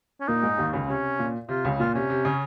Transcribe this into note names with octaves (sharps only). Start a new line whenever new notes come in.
C#4
A#2 A#3 D#4
G#2 G#3
D#2 D#3
C#2 C#3
C3 C#4
A#2
C3 F4
C#2 C#3
A#2 F4
C3 C#4
C3
C#3